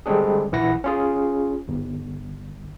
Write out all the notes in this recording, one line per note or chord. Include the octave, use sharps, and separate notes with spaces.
D3 G3 G#3 C4 D4 G#4
A#1 E3 E4 F#5 A#6
C#4 F4 G#4
G1